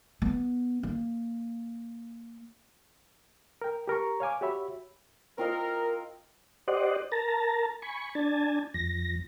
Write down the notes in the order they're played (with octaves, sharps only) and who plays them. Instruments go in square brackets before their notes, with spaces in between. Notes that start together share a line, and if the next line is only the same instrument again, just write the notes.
[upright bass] B3
A#3
[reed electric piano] A#4 G5
G4 A#4 A#5 C#6
C#5 F5 G#5 D6
F#4 G4 C#5 E5 B5
[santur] C4 F4 D#5 [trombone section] A#4
[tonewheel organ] G4 C5 D5 D#5 F#5
A#4 A5 A#5
G#5 B5 C#6
D4 G#5 A5
F2 A#6